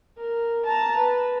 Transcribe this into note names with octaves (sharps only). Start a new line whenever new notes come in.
A#4
A5 A#5
B4